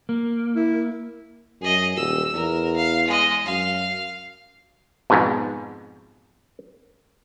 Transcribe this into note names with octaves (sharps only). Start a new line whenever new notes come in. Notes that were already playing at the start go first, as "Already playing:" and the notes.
A#3
E4
F#2 G#4 D#5
D#1 E6
E2 A#4
F5
G#3 D#5
F#2 F5
F2 G#2 B2